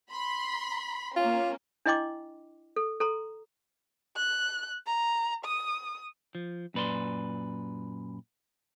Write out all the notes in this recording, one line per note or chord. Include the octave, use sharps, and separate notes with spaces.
B5 C6
A#3 C#4 F4
D4 E4 D#5 G5 C6 D6
A4
A4 A#5 C6
F#6
A#5
D#6
F3
F#2 A#2 B4 D5 C6